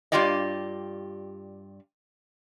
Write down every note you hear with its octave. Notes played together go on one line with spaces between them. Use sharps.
G2 B3 F4 G4 D5 D#5